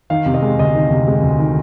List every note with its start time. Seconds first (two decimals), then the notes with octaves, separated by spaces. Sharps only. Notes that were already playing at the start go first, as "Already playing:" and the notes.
0.10 D#3 F5
0.26 C3
0.34 D#5
0.42 G#3
0.59 D2 D#5
0.75 D#3
0.90 C3
1.07 G#3
1.23 D2
1.39 D#3